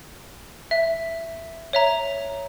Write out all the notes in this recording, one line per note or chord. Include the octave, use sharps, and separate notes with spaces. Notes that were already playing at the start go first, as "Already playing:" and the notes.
E5
C#5 E5 A#5